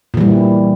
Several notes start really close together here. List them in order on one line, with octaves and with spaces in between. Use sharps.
A#2 E3 G3